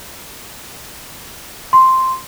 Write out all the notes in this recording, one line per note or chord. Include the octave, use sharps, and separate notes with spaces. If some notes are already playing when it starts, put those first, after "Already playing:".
C6